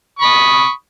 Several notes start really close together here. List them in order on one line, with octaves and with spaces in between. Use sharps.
C#6 B5 D#6